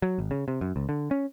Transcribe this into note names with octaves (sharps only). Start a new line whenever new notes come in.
F#3
G#1
C#3
C3
F#2
C#2
D3
C#4